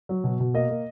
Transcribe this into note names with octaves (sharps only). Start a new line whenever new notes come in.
F#3
B2
B2
A#3 D#5
A#3